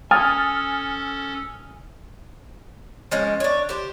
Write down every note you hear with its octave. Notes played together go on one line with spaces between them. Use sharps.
C#4 A4 G#5 D#6 F6 A6
F3 G#3 C#4
D4 C#5
G4 C5